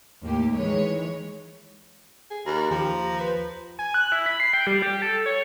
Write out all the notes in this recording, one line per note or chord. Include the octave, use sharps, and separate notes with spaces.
D#2 A2 A#3 G4
D#3 E3 G#3 C#5
G#4
D#2 A#5
D#2 F3 G4
B4
G#5
F#6
E4
B5
C7
G5
G3
G4
A4
C#5